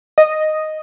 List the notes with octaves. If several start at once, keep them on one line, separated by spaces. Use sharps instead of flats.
D#5